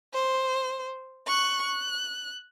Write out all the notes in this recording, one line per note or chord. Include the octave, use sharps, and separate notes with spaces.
C5
C#6 F#6
F#6